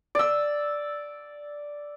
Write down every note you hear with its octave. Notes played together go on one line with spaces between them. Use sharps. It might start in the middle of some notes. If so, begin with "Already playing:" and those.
D5 E6